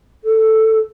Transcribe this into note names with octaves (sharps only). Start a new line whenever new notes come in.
A4